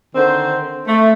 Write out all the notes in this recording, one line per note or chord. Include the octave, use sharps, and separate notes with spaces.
D3 D#3 C4 C5
A3